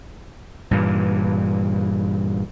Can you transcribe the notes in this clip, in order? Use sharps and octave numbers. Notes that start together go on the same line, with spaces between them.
G2 A#2 E3